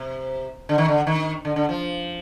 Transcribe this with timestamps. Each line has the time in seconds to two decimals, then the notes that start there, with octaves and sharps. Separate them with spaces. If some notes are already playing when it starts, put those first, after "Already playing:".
Already playing: C3
0.69 D3
0.78 D#3
0.88 D3
1.07 D#3
1.45 D3
1.56 D3
1.69 F3